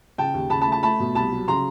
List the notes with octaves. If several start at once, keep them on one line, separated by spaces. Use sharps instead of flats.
C#3 G5 A5
D#2
C#3 A5 B5
A5 B5
A3
A5 B5
A3 A5 B5
B2
C2 A5 B5
F#3
C#3 A#5 C6